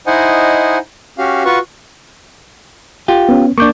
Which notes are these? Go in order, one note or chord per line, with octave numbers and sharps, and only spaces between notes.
D#4 E4 C5 D#5 F#5 G#5
C#4 F#4 G4 F5
F4 F#4 B4 C#6
F4 G4
B3 C#4
A#3 D4 C#6 D6 G6